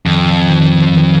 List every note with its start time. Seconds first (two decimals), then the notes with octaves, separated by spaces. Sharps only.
0.06 F2 D#3
0.50 D#3
0.96 D#3